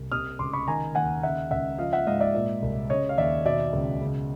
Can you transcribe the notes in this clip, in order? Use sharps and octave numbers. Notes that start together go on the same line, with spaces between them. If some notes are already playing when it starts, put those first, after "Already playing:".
Already playing: C2
C3 D#6 F6
C#2 C6 D6
B5 C#6
D#3 G#5 A#5
D#2 F#5 G#5
C#3 E5 F#5
C#2 E5 F#5
F3 D#5 F5
E5 F#5
G#2 D#5 F5
D5 E5
A#2
C2
C#3 C#5 D#5
F5
D#2 D5 E5
B2 D5 E5
C#2
C#3